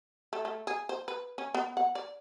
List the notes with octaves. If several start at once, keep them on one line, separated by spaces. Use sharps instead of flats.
A3
A3
G#4
C5
B4
C#4
B3
F#5
D5